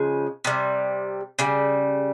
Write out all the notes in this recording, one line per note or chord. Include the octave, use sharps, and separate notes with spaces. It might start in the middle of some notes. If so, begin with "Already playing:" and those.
Already playing: C#3 F3 G#3
C3 G3
C#3 G3